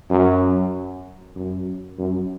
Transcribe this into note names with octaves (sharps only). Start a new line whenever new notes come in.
F#2
F#2
F#2